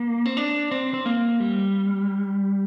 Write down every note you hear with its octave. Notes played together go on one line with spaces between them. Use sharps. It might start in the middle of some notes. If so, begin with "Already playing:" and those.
Already playing: A#3
C4
D4
C4
C4
A#3
G3